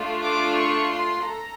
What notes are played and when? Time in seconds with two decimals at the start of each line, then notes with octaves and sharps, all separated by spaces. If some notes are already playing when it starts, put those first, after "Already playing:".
Already playing: A3 D4 F4
0.23 D6
0.57 C#6
0.91 C6
1.25 A4 A#5